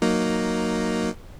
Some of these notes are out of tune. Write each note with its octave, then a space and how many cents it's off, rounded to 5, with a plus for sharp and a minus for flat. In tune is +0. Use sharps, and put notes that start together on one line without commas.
F#3 +0 A#3 +0 D#4 +0